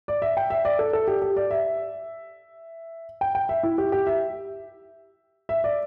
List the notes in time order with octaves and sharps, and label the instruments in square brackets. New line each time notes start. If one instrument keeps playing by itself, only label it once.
[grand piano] D5
E5
G5
E5
D5
A4
A4
G4
G4
D5
E5
G5
G5
E5
E4
G4
G4
E5
E5
D5